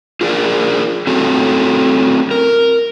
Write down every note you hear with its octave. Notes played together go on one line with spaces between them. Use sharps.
F4 G#4 A#4 D5
A3 C4 C#4 F#4 A4
A#4